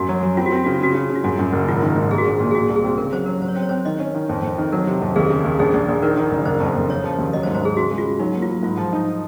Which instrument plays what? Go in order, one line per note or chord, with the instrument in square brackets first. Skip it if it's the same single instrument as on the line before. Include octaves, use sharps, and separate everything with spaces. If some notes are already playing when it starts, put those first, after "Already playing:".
Already playing: [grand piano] F#2 [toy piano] F#4
[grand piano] F#3
F#3
[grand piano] C4 [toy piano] F4
[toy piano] F#4
[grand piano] C4 [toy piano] F4
[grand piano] C#3 [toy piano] F#4
[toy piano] F4
[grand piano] C#3 [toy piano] F#4
[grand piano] C#3 [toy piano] F4
[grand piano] C#3
[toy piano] F4
[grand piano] F#2 [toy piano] F#4
[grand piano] F#2
F#1
[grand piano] G#1 [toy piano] F4
[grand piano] D#3
G#2
[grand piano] G#3 [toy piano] G#4
[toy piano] F#4
[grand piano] A#1 [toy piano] G#4
[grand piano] A#2
[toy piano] G#4
[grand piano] A#2 [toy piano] F#4
[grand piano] C2
[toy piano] G#4
[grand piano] C4
[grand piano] C#3 [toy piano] A#4
[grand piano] F#3 [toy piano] C5
[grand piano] F#3 [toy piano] A#4
[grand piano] F#3 [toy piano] C5
[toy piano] C#5
[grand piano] C4 [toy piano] C5
[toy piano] C#5
[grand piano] C4 [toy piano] C5
[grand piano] D#3 [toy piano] D#5
[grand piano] C#4
D#3
F2
F2
D#3
[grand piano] F#3 [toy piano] A#4
[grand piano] C3
F2
[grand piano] D#2 [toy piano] G#4
[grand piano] C#3
D#2
[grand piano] A#1 [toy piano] G#4
[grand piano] A#1
A#1
[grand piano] D#3 [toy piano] A#4
[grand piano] D#3
F#1
[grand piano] F#1 [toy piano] C5
[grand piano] F2
F2
[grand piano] C#3 [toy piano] C#5
[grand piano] F3
D#2
[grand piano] F#3 [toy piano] D#5
[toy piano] C5
[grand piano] G#2
[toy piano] C5
[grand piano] G#2 [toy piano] G#4
[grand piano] C#3 [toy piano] F#4
[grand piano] G#3
[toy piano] F4
[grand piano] G#3
[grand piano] F#3 [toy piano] D#4
[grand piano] A#3
[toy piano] F4
[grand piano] F#3
[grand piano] G#2 [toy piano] F4
[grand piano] F3
D#4